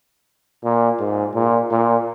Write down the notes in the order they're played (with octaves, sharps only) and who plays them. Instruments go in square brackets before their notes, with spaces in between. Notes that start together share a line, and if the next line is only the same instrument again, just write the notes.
[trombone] A#2
G#2
A#2
A#2